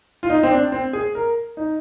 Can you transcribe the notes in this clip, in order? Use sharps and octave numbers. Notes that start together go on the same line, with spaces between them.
F4
D#4
C4
D4
C4
G#4
A#4
D#4